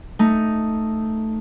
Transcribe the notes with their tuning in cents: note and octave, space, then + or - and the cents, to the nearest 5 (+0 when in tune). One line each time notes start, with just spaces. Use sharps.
A3 +0 D#4 +0